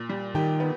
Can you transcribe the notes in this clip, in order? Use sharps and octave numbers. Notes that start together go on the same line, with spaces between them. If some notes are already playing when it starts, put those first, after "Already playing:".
Already playing: A#2
G3
D#3 G4
B3